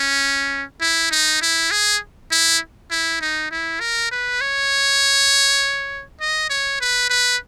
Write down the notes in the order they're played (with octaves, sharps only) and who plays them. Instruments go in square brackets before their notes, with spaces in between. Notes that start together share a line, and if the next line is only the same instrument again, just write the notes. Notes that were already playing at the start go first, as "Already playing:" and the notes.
Already playing: [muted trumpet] C#4
E4
D#4
E4
G#4
E4
E4
D#4
E4
A#4
B4
C#5
D#5
C#5
B4
B4